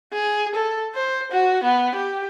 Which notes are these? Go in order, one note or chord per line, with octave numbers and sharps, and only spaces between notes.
G#4
A4
C5
F#4
B3
G4